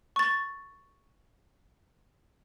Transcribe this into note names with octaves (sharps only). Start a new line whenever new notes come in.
C#6 A6